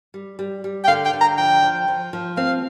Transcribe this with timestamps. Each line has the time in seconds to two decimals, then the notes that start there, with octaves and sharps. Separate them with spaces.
0.14 G3
0.39 G3
0.64 G3
0.84 G5
0.88 D3 F5
1.05 G5
1.13 D3
1.21 A#5
1.38 F3 G5
1.62 F3
1.88 F3
2.13 F3
2.37 C4 F5